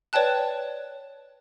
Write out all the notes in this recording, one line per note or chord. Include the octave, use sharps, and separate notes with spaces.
B4 C#5 D5 G5 A5 F#6